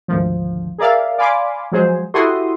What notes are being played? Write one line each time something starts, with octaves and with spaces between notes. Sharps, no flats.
G#1 D2 F3
G#4 A#4 D5 E5 F5
D5 F5 G#5 B5 C6 D6
F3 F#3 G#3 G#4 C5
E4 F#4 G4 A4 C6 D#6